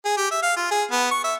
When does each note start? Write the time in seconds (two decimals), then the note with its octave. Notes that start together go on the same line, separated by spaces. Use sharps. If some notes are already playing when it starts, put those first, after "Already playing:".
0.05 G#4
0.17 G4
0.31 E5
0.42 F5
0.56 F4
0.71 G#4
0.91 B3
1.11 C#6
1.24 E5